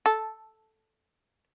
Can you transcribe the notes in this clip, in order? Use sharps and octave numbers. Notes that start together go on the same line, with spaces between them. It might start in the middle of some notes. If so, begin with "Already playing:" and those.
A4